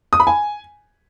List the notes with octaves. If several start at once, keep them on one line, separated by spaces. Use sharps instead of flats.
D#6
B5
G#5